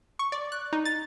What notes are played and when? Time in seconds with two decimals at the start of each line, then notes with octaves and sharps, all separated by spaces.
0.19 C#6
0.32 D5
0.52 F#6
0.73 D#4
0.85 A6